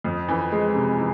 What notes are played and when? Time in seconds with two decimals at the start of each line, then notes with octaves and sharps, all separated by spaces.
0.04 F2
0.28 E3
0.52 G#3
0.75 C3
0.98 E3